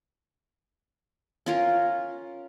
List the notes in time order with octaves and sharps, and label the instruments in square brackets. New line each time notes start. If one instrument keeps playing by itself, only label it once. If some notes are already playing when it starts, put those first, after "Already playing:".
[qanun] C#4 F4 A#4